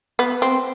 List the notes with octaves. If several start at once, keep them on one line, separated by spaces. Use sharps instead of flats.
B3
C4